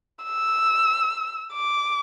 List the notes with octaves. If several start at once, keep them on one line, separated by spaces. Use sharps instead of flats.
E6
D6